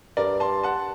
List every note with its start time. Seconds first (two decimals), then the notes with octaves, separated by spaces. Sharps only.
0.17 G2 A#4 D5
0.40 A5 C6
0.63 F#5 A5